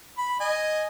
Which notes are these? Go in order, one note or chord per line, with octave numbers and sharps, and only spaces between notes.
B5
D#5 G#5